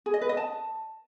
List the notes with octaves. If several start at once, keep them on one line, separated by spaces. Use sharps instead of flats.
G#4
D#5
B4
D#5
A5